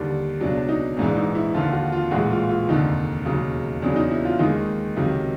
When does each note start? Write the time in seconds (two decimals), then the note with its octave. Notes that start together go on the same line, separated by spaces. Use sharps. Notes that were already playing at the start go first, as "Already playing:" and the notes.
Already playing: D#2 D3 G3
0.41 C#2 B2 F#3 D4
0.58 D4
0.69 D#4
0.97 A#1 G#2 E3 D4
1.17 D#4
1.35 E4
1.54 D#2 D3 F3 F4
1.73 F#4
1.92 F4
2.11 A#1 A2 E3 G#3 F#4
2.30 F4
2.49 F4
2.68 F1 D#2 D3 D#4
3.25 E1 D#2 C#3 F#3
3.82 E2 C#3 F#3 D4
3.96 D#4
4.10 E4
4.25 F4
4.39 D#2 D#3 G#3 D#4
4.96 C#2 C3 D#3 F#3